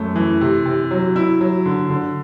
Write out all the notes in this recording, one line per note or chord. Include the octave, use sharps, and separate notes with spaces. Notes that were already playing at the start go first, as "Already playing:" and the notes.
Already playing: F#2 A3
E3
C3
C3
F#3
E4
F#3
D3
D3